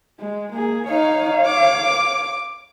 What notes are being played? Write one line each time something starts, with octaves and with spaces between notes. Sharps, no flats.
G#3
A#3 G#4
D#4 C#5 F5
D6